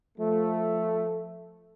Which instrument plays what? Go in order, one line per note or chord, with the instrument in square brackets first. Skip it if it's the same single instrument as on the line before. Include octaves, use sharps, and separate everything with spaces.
[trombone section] F3 A3